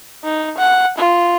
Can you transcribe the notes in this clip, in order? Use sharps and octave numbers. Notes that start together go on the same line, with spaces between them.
D#4
F#5
F4